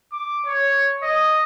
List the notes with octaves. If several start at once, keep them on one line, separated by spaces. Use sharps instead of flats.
D6
C#5
D#5